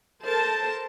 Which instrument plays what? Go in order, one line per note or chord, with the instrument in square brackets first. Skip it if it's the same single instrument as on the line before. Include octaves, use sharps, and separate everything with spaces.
[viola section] A4 A#4 C5 A5